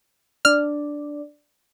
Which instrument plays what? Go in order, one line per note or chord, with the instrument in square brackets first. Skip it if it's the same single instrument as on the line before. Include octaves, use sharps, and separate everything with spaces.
[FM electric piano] D4 D5 [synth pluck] F6